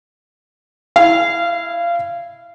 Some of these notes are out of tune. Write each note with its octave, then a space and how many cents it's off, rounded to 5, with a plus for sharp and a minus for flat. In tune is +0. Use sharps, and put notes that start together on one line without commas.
E4 +0 F5 -25